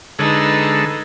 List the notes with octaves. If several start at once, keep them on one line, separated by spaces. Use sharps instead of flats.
D3 G#3 D#4 A4 B4